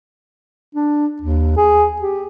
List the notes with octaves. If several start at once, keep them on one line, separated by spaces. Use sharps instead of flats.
D4
D#2
G#4
G4